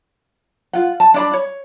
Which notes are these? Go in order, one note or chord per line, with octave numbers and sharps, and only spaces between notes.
F4 F#5
A5
D4 D5 B5
C#5